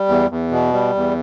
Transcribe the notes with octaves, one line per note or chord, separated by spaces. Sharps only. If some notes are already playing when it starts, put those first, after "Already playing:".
Already playing: G3
E2
E2
B2
G3
E2